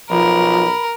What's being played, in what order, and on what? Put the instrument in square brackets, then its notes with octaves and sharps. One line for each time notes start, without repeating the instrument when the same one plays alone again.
[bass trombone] B1 [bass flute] F3 [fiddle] A#4 [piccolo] B5